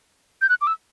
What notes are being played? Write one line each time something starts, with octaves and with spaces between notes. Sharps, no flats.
G6
F#6
D6
E6